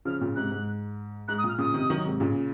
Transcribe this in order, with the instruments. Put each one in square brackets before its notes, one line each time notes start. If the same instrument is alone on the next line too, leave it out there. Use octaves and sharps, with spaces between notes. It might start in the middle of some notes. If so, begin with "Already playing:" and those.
[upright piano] C#3 F3 [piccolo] F6
[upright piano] A#2 C#3
[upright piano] G#2 C3 [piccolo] F#6
[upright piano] G#2
[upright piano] G#2 [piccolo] F#6
[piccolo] D#6
[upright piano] A#2 [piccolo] F6
[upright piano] A#2 C#3 [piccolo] D#6
[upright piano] C3 D#3
D#3 F#3
G#2 C3
A#2 C#3